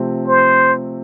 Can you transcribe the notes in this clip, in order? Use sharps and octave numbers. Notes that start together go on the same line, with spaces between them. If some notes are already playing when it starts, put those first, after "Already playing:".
Already playing: C3 F3 A3 C4
C5